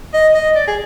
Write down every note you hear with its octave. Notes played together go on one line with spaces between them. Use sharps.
D#5
D#5
D5
G#4